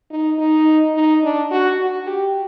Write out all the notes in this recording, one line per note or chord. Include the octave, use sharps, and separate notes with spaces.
D#4
D#4
D#4
D4
F#4
F#4
G4